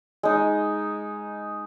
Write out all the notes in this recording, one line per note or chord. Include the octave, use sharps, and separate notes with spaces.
G#3 D#4